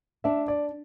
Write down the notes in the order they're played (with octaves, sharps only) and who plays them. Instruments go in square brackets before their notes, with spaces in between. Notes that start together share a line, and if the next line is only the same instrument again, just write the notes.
[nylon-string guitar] D4 [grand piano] E5
[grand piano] D5